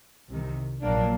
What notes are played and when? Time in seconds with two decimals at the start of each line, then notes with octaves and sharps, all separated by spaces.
0.28 C2 C3 D#3
0.81 A#1 A#2 F#3 A#3 D4